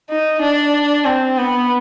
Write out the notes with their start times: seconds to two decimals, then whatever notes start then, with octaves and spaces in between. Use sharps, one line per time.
0.10 D#4
0.42 D4
1.05 C4
1.38 B3